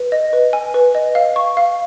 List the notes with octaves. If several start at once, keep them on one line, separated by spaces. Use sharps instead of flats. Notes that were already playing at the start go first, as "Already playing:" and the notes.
Already playing: B4
D#5
B4
G#5
B4
D#5
F5
C#6
F5